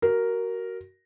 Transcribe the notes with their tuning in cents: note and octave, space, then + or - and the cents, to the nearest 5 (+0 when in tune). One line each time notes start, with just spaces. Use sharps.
F#4 +20 A#4 +0